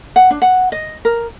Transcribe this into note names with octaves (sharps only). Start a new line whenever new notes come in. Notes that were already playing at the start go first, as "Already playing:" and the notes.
F#5
D4
F#5
D#5
A#4